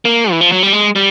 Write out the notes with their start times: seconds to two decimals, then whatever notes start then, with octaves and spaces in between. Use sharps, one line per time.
0.05 A#3
0.31 E3
0.41 F3
0.52 F#3
0.63 G3
0.73 G#3
0.96 G3